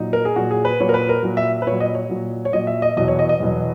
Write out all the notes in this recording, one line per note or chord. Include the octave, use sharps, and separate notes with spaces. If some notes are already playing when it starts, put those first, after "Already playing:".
Already playing: A#2 F#3 D#4
A#4
G#4
A#2 F#3 F#4
G#4
B4
A#2 F#3 C#5
A#4
B4
A#4
A#2 F#3
E5
B4
A#2 F#3 C#5
D#5
C#5
A#2 F#3
C#5
A#2 F#3 D#5
E5
D#5
E2 B2 F#3 D#5
C#5
D#5
D#5
E2 B2 F#3